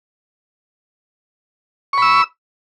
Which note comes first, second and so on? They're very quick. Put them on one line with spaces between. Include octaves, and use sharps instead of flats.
C#6 B5 E6